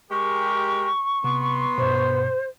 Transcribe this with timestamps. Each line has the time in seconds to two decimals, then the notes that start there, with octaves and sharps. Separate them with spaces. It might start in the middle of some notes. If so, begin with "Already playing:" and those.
0.11 G#3 G4 A#4 C#6
1.24 C3 B3 C6
1.78 G2 B2 C5